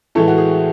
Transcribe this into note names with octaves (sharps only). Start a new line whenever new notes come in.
A2 E3 G#3 A4
F#4
G#4